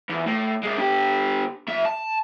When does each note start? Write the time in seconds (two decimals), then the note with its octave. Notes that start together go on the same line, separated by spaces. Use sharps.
0.09 E2
0.26 A2
0.63 C3 G#3
0.78 D3 G4
1.68 F2 E5
1.85 A5